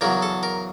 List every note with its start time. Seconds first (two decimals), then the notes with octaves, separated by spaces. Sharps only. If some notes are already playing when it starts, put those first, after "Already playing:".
0.01 E2 C#3 F#3 A#4
0.22 A4
0.43 A#4